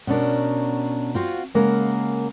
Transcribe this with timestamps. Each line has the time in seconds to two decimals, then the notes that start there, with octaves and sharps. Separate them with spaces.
0.07 B2 C#4 D4 A#4
1.14 C4 F4 F#4
1.55 C#3 G#3 A#3 A#4 F#5